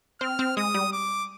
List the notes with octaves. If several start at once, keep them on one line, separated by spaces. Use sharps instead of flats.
C4 F6
C4
G#3 D#6
G3
D6